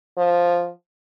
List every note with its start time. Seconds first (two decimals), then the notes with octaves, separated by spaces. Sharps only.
0.18 F3